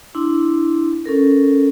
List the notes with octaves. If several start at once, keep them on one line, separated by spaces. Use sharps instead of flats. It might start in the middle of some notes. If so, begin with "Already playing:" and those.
D4 E4 C6
C#4 A4 A#4